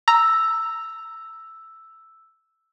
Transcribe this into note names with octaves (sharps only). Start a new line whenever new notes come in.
A#5 E6